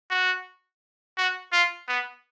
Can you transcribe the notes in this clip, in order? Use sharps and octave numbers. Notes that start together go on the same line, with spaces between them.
F#4
F#4
F4
B3